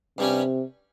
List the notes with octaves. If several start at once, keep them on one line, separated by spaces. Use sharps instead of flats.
G2 C3 G3 C#4